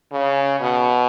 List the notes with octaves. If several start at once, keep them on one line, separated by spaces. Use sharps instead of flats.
C#3
B2